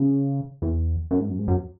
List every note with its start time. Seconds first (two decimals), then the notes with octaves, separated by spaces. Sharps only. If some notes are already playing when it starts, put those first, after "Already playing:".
Already playing: C#3
0.62 E2
1.11 F#2
1.19 G#2
1.29 F#2
1.39 G#2
1.48 F#2